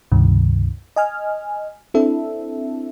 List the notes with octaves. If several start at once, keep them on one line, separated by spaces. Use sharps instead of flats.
C#2 G2 C3 D#3
D#5 G#5 F6
C4 D4 E4 A4 E5